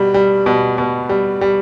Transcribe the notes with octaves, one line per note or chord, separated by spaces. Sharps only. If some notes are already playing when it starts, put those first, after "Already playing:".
Already playing: B2 G3
G3
B2
B2
G3
G3